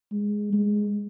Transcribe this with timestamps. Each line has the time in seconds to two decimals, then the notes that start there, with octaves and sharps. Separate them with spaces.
0.12 G#3
0.53 G#3